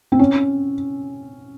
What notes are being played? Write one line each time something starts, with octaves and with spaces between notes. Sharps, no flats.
C4
C#4